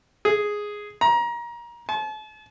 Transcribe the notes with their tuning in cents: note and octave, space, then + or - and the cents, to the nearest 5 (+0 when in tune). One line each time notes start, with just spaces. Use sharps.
G#4 +0
A#5 +25
A5 -40